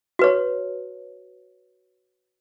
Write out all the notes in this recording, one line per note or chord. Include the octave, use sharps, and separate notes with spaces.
F#4 B4 C#5